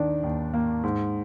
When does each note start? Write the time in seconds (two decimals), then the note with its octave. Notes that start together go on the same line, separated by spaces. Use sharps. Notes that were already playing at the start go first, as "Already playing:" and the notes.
Already playing: D#2 D#3 D4
0.24 D#2
0.54 A#3
0.83 G#2